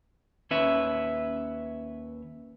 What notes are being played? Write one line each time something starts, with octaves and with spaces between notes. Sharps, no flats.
D#2 C#4 B4 E5